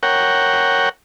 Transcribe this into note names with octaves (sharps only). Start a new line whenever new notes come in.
A#4 C#5 F#5 G5